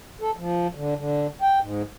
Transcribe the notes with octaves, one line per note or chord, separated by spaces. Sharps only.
A4
F3
D3
D3
G5
G#2